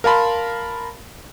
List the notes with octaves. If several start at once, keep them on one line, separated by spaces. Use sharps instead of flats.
A#4 F5 A5 B5 C6